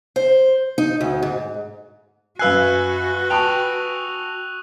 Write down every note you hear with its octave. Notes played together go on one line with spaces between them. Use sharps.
C5
D#4
D2
G#2
F#2 F#4 B4 F5 G#5 E6 F#6 C7
G5 A5 B5 C#6 D#6 F7